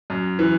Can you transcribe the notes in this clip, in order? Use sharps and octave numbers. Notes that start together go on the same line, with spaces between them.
F#2
E3